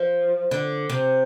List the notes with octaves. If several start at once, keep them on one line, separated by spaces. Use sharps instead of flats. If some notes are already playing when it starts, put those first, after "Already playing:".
Already playing: F3
D3
C3